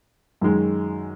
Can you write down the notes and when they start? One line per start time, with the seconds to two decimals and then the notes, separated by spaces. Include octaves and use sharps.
0.41 F#2 D#3 G#3